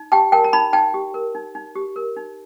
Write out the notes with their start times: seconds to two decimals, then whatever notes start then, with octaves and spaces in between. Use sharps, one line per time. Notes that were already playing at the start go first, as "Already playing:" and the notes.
Already playing: D#4
0.12 G4 G5 A5
0.32 A#4 G5 A5
0.44 A#5
0.53 D#4 A5 B5
0.73 D#4 G5 A5
0.94 G4
1.14 A#4
1.35 D#4
1.55 D#4
1.76 G4
1.96 A#4
2.17 D#4